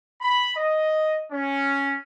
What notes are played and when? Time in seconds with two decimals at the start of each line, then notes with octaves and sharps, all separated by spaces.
0.21 B5
0.56 D#5
1.32 C#4